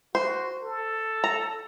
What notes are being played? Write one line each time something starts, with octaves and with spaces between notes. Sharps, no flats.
F#4 C5
A4
A#5